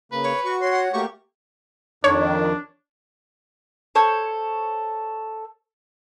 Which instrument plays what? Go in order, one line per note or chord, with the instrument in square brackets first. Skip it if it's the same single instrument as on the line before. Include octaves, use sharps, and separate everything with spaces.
[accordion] C#3 A#3 [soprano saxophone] B4
[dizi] C#5
[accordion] F#4 [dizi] C#6
[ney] C#5 [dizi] C6
[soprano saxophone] F#5
[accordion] A3 A#3 G4 [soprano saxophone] F#4 [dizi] C#6
[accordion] F2 D#3 [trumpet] D4 [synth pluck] C#5
[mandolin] A4 C5 C#5